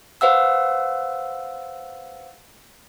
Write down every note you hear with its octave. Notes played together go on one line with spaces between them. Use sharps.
B4 C5 F5 F#5 E6